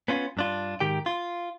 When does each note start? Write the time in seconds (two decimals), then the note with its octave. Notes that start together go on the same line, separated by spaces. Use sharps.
0.08 B3 C#4 F4
0.37 G2 D4 F4
0.80 G#2 D#3 G4 G5
1.06 F4